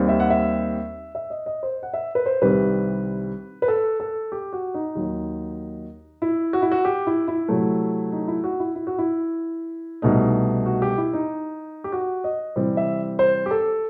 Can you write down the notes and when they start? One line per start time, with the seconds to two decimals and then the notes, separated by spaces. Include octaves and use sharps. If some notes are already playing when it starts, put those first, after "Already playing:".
Already playing: D#2 D#3 G3 C4
0.09 E5
0.20 F#5
0.30 E5
1.15 E5
1.30 D#5
1.46 D#5
1.63 C5
1.83 F#5
1.94 E5
2.15 B4
2.26 C5
2.42 C2 C3 D#3 G3 C4 B4
3.62 B4
3.68 A4
4.00 A4
4.32 G4
4.53 F#4
4.74 D#4
4.95 D#2 D#3 F#3
6.22 E4
6.53 F#4
6.62 E4
6.72 F#4
6.85 G4
7.07 E4
7.28 E4
7.48 C3 F#3 A3
8.12 D#4
8.28 E4
8.44 F#4
8.60 E4
8.75 E4
8.87 F#4
8.98 E4
10.02 C2 B2 A3 D#4
10.66 F#4
10.82 G4
10.98 E4
11.13 D#4
11.84 G4
11.92 F#4
12.24 D#5
12.56 C3 E3 G3 C4
12.77 E5
13.19 C5
13.46 G4
13.51 A4